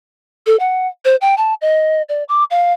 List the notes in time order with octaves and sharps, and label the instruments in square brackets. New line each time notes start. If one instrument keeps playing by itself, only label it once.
[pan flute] A4
F#5
C5
G5
A5
D#5
D5
D6
F5